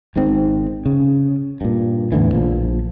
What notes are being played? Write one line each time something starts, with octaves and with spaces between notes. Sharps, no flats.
G#1 G#2 D#3 C4
C#3
G2 A#2
E2 A2 D3 E3
A#1 F3